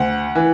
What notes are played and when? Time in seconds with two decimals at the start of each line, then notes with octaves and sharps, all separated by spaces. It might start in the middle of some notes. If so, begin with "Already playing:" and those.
Already playing: D2 F#5
0.35 E3